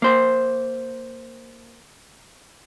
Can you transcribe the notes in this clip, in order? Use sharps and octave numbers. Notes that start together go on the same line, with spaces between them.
A#3 C5